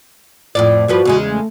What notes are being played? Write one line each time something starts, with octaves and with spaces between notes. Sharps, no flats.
F2 A2 F4 D5
G2 F3 F#4 B4
E2 C#3 G#3
A3